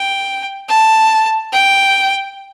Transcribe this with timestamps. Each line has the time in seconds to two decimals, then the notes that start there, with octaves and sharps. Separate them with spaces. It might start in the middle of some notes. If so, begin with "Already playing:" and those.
Already playing: G5
0.68 A5
1.53 G5